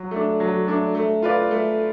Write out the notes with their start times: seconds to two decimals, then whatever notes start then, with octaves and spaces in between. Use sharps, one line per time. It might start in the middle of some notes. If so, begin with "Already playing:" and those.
Already playing: F#3
0.11 A3 D4
0.40 F#3
0.67 A3 D4
0.95 A3
1.22 F4 B4 D5
1.51 A3